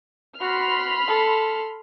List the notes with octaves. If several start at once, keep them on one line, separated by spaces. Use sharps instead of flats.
F#4 B5 C6 F6
A4